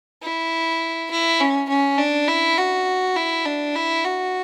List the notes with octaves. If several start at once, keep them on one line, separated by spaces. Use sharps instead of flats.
E4
E4
C#4
C#4
D4
E4
F#4
E4
D4
E4
F#4